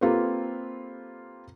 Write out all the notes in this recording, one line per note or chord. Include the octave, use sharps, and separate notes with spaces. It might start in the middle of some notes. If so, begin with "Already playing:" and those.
A#3 C4 F4 G4 A4 B4